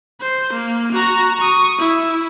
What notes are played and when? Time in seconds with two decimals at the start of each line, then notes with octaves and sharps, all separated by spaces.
0.21 C5
0.53 A#3
0.93 F#4 A#5
1.39 C#6 D#6
1.79 E4